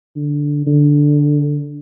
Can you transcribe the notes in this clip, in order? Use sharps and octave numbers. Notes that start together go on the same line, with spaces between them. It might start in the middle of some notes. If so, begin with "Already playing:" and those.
D3
D3